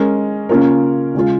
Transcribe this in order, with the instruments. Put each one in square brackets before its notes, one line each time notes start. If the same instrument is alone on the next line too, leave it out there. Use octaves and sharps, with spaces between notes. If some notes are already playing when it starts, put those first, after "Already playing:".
Already playing: [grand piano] G#3 C#4 A#4
C#3 A#3 C#4 F4 A#4
C#3 G#3 F4